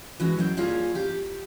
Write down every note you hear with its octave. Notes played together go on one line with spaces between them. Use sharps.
E3 G#3 C#4 F#4
F#3 G5
G3 A#3 C#4 F4 G#4
G4